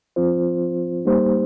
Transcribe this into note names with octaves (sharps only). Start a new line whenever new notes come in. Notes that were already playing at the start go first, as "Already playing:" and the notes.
F3 C4 F4 C5
G3 A#3 D#4 G4 C5